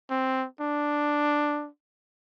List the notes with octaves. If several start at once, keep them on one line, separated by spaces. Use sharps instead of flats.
C4
D4